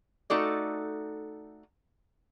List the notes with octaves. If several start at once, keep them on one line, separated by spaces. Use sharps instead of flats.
A3 D#4 F#4 A4 D5